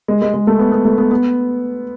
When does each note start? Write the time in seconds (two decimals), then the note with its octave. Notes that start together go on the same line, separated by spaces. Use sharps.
0.08 G#3
0.22 G#3
0.34 G#3
0.47 A3
0.59 B3
0.72 B3
0.85 A3
0.98 B3
1.11 B3